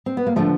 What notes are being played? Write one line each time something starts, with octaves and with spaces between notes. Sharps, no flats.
C4
B3
A#3
D3 F3 A3